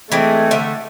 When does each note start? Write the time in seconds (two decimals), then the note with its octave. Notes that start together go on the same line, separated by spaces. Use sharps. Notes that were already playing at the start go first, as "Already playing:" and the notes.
0.12 E3 G#3 A3 C4
0.51 D3 E5